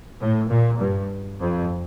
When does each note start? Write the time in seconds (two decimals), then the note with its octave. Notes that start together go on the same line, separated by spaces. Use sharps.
0.20 A2
0.49 A#2
0.79 G2
1.39 F2